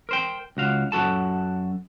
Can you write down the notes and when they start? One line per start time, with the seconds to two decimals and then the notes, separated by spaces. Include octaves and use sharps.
0.09 A#4 C5 G5
0.57 C#2 F#4 F5
0.92 F#2 F#4 A4 A5